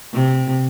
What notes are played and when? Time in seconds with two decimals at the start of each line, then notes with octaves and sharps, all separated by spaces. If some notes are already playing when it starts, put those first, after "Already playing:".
0.13 C3